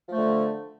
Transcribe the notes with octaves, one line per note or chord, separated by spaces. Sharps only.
D3 F3 A3